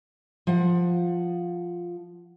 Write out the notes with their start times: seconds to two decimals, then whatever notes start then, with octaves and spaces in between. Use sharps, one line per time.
0.47 F3 F#5